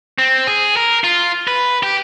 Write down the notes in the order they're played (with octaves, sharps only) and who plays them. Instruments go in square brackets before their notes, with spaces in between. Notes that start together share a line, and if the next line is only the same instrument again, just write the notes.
[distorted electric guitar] C4
G#4
A#4
F4
B4
G4